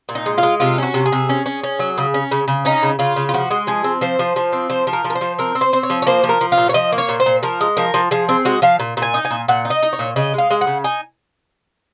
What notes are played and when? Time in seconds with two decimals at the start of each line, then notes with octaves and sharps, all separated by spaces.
0.09 A#2
0.15 D#4
0.26 G#3
0.38 F4
0.43 G#3
0.60 C3 F4
0.78 C#4 F#4
0.94 C3
1.06 G#4
1.12 C3
1.29 C#4
1.46 C#4
1.63 C#4
1.79 F#3
1.98 C#3
2.14 C#4
2.31 C#3
2.48 C#3
2.65 C#4 D#4
2.83 C#3
2.99 C#3 F4
3.16 C#3
3.29 F4
3.33 F3 F#4
3.51 G#3
3.67 F3 G#4
3.84 C4
4.01 F3 C5
4.19 F3
4.36 F3
4.52 C4
4.70 F3 C5
4.87 F3
4.93 A#4
5.04 F3
5.10 A#4
5.15 C5
5.21 F3
5.38 C4 A#4
5.55 C4
5.61 C5
5.73 C4
5.83 C#5
5.90 F3
6.02 C#5
6.07 A#3 C5
6.23 F3
6.29 A#4
6.41 F3
6.52 F4
6.58 A#2
6.69 C#5
6.74 F3 D#5
6.92 A#3
6.98 C#5
7.09 A#2
7.20 C5
7.26 A#2
7.43 F3 A#4
7.61 G#3
7.77 F3 A#4
7.94 F3
8.11 F3 G#4
8.29 C4 G#4
8.45 G#3 F#4
8.62 F3 F5
8.80 A#2
8.97 A#2
9.02 G#5
9.14 D#4
9.25 G#5
9.31 A#2
9.48 A#2 F#5
9.65 D#4
9.70 D#5
9.83 D#4
9.93 C#5
9.99 A#2
10.16 C#3 D#5
10.34 G#3 F5
10.50 G#3
10.61 F#5
10.67 C#3
10.84 D#4 G#5